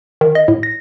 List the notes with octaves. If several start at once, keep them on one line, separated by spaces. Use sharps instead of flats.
D#3
D#5
A2
A#6